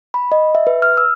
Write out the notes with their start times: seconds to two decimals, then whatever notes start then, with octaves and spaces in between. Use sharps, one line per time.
0.14 B5
0.32 D#5
0.55 E5
0.67 B4
0.82 F6
0.97 E6